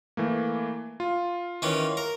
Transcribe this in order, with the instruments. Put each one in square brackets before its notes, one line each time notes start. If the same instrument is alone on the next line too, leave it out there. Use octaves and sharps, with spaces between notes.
[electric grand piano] E3 A3 A#3
F4
[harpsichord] D#3 E3 C#4
A#4